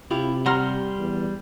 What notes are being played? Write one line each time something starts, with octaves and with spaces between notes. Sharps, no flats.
C3 E4 F4 G4
G3 F#5 A#5 C6 F6
E2